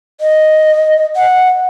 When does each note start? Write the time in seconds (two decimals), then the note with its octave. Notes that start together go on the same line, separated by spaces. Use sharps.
0.21 D#5
1.16 F#5